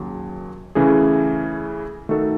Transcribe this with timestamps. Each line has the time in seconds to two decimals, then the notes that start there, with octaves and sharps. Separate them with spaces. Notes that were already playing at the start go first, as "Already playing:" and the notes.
Already playing: D#2 C#3 F#3
0.75 C#3 E3 A3 C#4 G#4
2.09 D#3 A3 D#4 F#4 A4